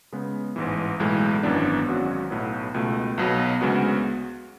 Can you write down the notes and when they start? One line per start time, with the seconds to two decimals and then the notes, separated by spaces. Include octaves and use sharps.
0.12 C#3 G#3 B3
0.56 A1 G#2 E3
0.99 B1 A2 E3 G#3
1.43 G#1 F#2 E3 B3 D4
1.87 G#1 G#2 F#3 C#4 F#4
2.30 B1 A2 F#3 B3
2.74 C#2 B2 A3
3.18 B1 B2 F#3
3.61 D2 C#3 G#3 B3 F#4